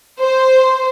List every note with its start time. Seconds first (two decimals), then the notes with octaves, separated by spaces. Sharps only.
0.20 C5